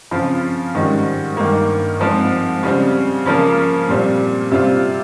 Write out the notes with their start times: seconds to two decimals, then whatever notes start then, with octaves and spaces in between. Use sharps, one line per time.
0.11 C#3 F3 C4 F4
0.75 G#2 D#3 G3 C#4
1.37 G2 D#3 A#3
1.99 G#2 F3 C4
2.63 C#3 G3 C4
3.26 C#3 F3 A#3
3.88 A#2 G3 C4
4.51 C3 G3 C4 F4